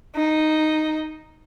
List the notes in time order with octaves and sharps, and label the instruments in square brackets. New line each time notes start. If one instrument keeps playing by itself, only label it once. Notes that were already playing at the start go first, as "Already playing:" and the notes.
[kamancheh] D#4